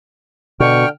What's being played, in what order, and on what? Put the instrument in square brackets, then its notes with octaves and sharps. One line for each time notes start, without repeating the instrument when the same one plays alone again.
[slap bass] B2 [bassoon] D3 [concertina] G5 F6 [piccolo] C#6